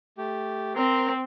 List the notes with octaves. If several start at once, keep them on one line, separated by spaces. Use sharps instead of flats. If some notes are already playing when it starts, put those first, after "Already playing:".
A3 G4
C4 A#4 A#5 C6